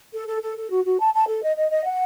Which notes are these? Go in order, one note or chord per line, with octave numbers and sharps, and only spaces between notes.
A4
A4
A4
A4
F#4
F#4
A5
A5
A4
D#5
D#5
D#5
F#5